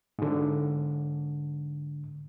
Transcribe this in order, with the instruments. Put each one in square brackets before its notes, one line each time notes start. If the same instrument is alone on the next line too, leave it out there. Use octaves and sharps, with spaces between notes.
[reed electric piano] G#2 D3